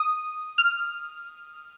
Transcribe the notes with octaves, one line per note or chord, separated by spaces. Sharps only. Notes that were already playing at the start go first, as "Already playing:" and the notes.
Already playing: D#6
F6